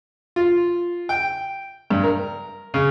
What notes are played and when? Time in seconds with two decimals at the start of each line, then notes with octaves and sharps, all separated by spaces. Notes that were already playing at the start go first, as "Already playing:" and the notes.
0.36 F4
1.09 G5
1.90 G2
2.04 A#4
2.74 C#3